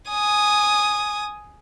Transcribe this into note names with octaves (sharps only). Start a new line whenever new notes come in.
G#5 D#6